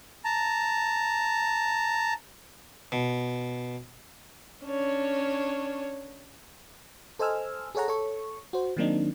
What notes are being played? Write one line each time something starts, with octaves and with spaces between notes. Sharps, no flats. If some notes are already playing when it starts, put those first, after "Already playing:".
A5 A#5
B2
C#4 D4 C#5
A4 C5 D#5 G#5 E6 F6
G#4 A4 C#5 F#5 A#5
A4 C#5 C#6
F#4 C5
D#3 F#3 A#3 C4 D4 D#4